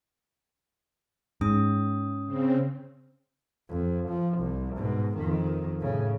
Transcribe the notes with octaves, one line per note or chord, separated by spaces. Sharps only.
G#2 C#4 D#6
C#3 C4
F2
F3
C2
G#2 B2
F2 D#3
A2 C#3